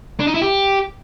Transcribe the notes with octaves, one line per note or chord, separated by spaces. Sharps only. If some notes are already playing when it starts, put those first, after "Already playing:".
D4
D#4
E4
G4